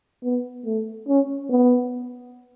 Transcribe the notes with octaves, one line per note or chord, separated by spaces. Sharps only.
B3
A3
C#4
B3